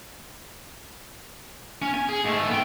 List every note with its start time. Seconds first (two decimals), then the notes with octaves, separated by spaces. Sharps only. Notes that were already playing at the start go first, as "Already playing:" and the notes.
1.82 C#4
1.94 G#5
2.09 G#4
2.24 G#2 A3
2.49 B3 G5